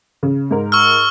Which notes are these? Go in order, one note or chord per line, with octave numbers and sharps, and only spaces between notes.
C#3
G#2 A#4
C#6 E6 F6